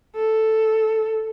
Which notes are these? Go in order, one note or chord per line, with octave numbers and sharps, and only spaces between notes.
A4